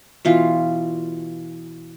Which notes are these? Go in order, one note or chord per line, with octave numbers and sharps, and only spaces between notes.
B2 E3 F4